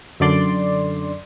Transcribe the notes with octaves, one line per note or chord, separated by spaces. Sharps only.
F#2 D3 D5 C6